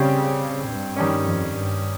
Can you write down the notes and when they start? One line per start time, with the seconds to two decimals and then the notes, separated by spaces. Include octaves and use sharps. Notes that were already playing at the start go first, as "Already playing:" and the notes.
Already playing: C#3 G3 C4 G4 C#5
0.68 G2
0.96 D#3 G3 C#4
1.26 F2
1.54 G2